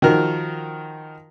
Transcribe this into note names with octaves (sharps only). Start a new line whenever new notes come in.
D#3 F3 F#4 A#4